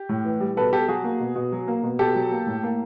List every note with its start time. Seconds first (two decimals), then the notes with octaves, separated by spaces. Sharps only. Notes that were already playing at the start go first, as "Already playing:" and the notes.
Already playing: G4
0.09 A2
0.25 E3
0.40 G3
0.57 B2 A4 B4
0.72 B2 G4 A4
0.88 F#3 F#4 G#4
1.04 A#3
1.20 B2
1.36 B2
1.52 F#3
1.68 A#3
1.83 B2
1.99 B2 G4 A4
2.15 F#3
2.32 A#3
2.47 A2
2.63 A#3